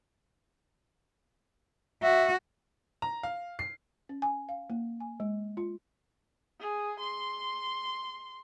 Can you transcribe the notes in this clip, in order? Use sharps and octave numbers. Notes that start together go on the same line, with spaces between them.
F#4 E5
A#5
F5
C7
C#4
G#5
F5
A#3
G#5
G#3
F4
G#4
C6